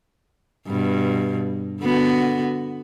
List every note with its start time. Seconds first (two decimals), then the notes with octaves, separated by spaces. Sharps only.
0.67 G2 B2
1.81 D3 B3 F#4